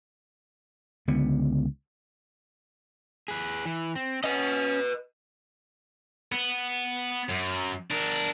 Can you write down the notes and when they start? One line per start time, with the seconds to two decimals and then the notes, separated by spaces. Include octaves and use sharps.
1.08 C#2 D3 B3
3.28 G#4 B4
3.65 E3
3.96 C4
4.24 C#4 B4 D#5
6.32 B3
7.29 F#2
7.91 D4 A#4